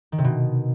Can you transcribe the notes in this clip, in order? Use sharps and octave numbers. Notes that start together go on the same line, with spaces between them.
D#3
C3
B2